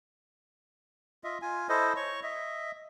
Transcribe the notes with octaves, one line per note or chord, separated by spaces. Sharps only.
F4 D#5 E5
F4 G#5
E4 A4 C5 D#5
C#5 C#6
D#5 E5